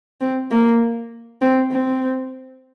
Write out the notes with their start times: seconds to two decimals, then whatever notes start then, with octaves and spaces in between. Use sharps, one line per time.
0.21 C4
0.50 A#3
1.41 C4
1.71 C4